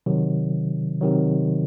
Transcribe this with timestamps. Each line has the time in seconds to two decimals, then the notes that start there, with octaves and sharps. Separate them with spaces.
0.06 C3 D#3 F#3
1.01 C3 D#3 F#3